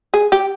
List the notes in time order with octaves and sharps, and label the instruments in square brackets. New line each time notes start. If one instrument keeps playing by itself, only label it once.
[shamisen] G#4
G4